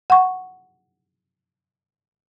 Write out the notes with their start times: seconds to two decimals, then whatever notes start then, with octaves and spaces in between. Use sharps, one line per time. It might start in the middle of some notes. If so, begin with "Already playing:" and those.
0.10 F#5 C#6